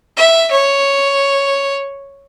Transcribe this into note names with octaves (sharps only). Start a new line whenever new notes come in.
E5
C#5